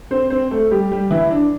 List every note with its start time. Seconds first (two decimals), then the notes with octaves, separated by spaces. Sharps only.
0.11 C4 C5
0.30 C4 C5
0.51 A3 A4
0.71 G3 G4
0.91 G3 G4
1.11 E3 E4
1.31 D4